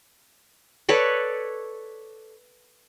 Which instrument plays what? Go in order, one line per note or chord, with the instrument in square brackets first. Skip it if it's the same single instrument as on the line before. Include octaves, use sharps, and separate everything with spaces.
[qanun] A4 B4 C#5 D5